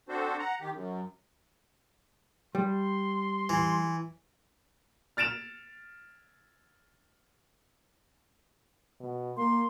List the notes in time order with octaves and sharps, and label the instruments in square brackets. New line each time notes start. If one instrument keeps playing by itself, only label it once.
[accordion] C4 D4 F#4 A4 C5
F#5 A#5
D#3 G4
F#2
[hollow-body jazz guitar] G3 [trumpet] C6
[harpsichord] E3
[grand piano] F6 A6 D7 E7 F7
[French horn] B2
[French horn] A#3 [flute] C6